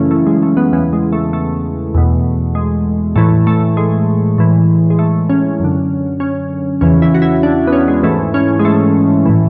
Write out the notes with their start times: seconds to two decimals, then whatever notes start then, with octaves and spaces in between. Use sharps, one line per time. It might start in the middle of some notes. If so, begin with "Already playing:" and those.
Already playing: F#2 C#3 E3 A3 C#4 E4
0.11 A3
0.26 G#3
0.43 A3
0.57 B3
0.72 E2 C#3 E3 B3
0.93 G#3
1.12 A3
1.33 A3
1.95 E2 B2
2.55 G#3
3.16 A2 E3 A3
3.47 A3
3.77 G#3
4.38 A2 E3
4.90 G#3
4.99 A3
5.29 C#4
5.60 F#2 D3
6.20 C#4
6.81 E2 C#3 E3 C#4
7.02 E4
7.14 F#4
7.22 E4
7.43 D4
7.67 B3
7.73 C#4
7.88 G#3
8.03 G#2 E3 A3
8.34 C#4
8.59 G#3
8.65 A3
9.26 A2 E3